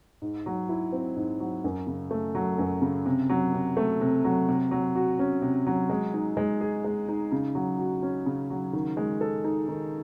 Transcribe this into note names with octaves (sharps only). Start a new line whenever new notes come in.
G#2
F#3
E4
C4
G#2
F#3
F#2
C#3
A3
F#3
F#2
C#3
C3
F#3
C3
A3
C3
F#3
C3
F#3
F#4
C#4
C3
F#3
G#3
D#4
G#3
G#4
G#3
D#4
C#3
F#3
F#4
C#4
C#3
F#3
D#3
G#3
A4
D#4
D#3